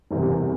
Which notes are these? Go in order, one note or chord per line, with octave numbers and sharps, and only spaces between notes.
F#1 E2 C3 E3 G3